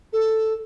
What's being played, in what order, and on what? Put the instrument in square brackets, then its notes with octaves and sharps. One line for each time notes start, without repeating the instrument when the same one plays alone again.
[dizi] A4